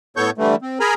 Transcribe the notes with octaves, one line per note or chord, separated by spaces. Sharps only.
A2 B3 A4 C#5 C#6 G6
D3 E3 G3 A3
C4
G#4 A#4 G#5 A#5 B5